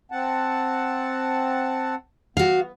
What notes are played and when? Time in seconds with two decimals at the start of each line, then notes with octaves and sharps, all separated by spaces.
0.12 C4 F#5 A5
2.37 B3 F#4 F5